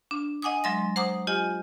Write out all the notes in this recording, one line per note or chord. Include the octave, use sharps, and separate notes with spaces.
D4
D#5 F#5 G#5 D6 D#6
F#3 G#3 E5 C6 A#6
C5 F#5 A#5 D6 D#6
F4 G4 D#5 G#5